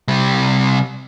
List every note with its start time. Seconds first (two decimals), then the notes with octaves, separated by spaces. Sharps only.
0.08 C3 G3